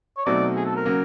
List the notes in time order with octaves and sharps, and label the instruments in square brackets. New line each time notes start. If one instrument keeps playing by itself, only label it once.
[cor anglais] C#5
[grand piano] B2 F#3 A3 C4 D#4 [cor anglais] D5
[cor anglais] G#4
A4
A#4
[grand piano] C#3 F#3 A#3 C#4